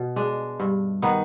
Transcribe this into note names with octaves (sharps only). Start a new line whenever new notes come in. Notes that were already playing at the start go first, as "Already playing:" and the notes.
Already playing: B2
G#3 D4
G2
D#3 B3 D#4